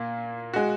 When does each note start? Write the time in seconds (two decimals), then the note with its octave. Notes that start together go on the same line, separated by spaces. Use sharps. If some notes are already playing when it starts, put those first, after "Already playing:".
Already playing: A#2 A#3
0.54 G#3 F#4